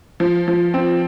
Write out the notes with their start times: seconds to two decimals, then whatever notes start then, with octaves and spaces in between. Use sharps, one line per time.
0.20 F3
0.48 F3
0.74 C4